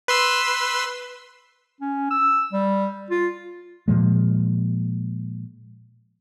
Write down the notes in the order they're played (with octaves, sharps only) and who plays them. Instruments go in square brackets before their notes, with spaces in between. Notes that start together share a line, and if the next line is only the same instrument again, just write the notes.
[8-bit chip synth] B4 C6 E6
[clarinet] C#4
E6
G3
F4
[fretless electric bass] A#2 F3 G#3